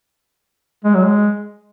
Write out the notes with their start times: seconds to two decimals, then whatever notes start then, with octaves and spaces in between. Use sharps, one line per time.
0.84 G#3
0.94 F#3
1.05 G#3